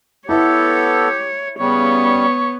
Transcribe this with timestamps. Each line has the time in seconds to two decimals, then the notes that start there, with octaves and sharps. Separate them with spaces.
0.29 B3 E4 G4 A4 C#5
1.59 C#3 G3 B3 C#5